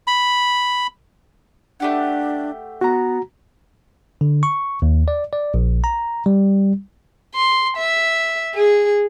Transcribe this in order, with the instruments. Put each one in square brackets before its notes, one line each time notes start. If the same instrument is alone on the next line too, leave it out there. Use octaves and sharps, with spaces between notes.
[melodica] B5
[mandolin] A3 G4 F#5 [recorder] D4
[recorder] B3 [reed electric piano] F#4 A#5
[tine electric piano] D3
C#6
D#2
D5
D5
A#1
A#5
G3
[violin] C6
E5
G#4